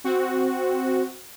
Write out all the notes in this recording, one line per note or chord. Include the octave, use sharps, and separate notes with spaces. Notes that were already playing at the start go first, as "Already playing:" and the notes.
C4 F#4